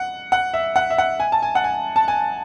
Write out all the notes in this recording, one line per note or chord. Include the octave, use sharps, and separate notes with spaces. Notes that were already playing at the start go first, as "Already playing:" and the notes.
Already playing: F#5
F#5
E5
F#5
E5
F#5
G#5
A5
G#5
F#5
G#5
A5
G#5